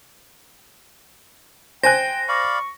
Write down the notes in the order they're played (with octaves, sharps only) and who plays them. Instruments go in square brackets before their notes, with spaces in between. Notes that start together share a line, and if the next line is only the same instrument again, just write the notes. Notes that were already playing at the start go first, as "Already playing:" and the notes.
[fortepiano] C5 G#5 F#6 [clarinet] G5 [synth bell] A#6
[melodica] D5 F5 B5 [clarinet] C#6